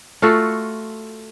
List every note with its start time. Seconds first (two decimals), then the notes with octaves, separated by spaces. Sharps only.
0.22 A3 F4 F#4 A4